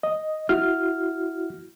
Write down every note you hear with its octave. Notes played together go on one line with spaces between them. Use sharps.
D#5
E4 F#4 F6